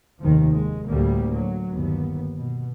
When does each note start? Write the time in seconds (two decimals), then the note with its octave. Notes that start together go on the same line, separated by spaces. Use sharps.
0.21 F1 D#2 D#3 F3
0.56 G#3
0.87 D2 A2 G3 A#3
1.35 F#3
1.71 G1 D#2 B3
2.36 B2